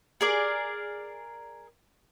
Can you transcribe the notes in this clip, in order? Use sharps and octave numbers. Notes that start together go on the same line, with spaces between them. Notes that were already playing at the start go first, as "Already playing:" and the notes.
G#4 A#4 D5